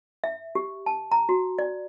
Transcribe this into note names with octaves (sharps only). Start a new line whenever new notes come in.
E5
G4
A5
A#5
F#4
D5